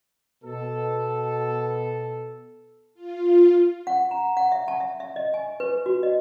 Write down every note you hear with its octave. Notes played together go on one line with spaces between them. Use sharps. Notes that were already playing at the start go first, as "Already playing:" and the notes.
B2 A4
F4
F#5
A#5
F#5
E5
A5
E5
E5
D#5
G#5
B4
F#4
D#5